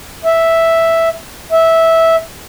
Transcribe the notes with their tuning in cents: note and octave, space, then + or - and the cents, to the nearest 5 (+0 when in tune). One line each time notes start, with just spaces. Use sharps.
E5 +0
E5 -10